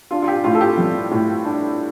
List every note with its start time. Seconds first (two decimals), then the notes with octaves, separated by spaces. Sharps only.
0.11 D4 F4
0.22 F4
0.27 G4
0.44 A2 F4
0.55 A4
0.61 G4
0.78 G3
1.11 A2
1.45 D4